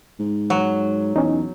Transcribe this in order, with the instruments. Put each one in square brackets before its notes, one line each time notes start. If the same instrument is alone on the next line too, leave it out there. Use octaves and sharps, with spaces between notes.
[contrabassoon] G#2
[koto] F#3
[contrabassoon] E2 [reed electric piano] C#4 D#4